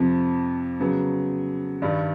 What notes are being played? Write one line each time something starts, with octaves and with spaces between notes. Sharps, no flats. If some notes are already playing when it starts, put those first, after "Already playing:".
Already playing: F2 C3 F3
C#3 F#3 B3
G2 D#3 G3